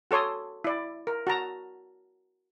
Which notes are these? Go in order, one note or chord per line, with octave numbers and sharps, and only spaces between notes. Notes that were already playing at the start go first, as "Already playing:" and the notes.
F#4 A4 C#5 C6 D#6
E4 D5
A#4
F#4 A5 A#5